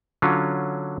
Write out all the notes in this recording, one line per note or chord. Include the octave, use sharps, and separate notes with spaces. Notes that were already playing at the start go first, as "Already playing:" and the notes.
D3 F#3 C#4 F4